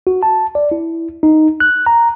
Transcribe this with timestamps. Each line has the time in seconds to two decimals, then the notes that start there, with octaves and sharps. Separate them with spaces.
0.07 F#4
0.23 A5
0.55 D5
0.71 E4
1.23 D#4
1.60 F#6
1.86 A#5